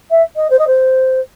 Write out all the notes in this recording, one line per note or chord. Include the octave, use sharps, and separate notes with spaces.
E5
D#5
C5
D#5
C5